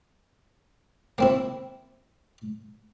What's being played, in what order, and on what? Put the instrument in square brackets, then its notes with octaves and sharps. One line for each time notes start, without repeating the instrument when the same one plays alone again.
[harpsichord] A#3 C4 E4